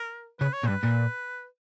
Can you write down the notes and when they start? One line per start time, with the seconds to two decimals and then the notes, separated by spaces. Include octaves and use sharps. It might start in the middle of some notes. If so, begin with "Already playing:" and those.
Already playing: A#4
0.40 C#3 B4
0.53 C#5
0.64 A#2
0.67 G2 B4
0.84 A#2